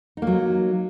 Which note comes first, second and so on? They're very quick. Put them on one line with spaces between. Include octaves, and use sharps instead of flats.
D#4 A#3 F#3